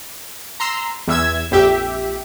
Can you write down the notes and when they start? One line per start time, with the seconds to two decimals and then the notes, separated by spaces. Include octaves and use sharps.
0.60 A#5 C6 E6
1.08 E2 E5 E6 G#6
1.51 A#1 F2 G4 E5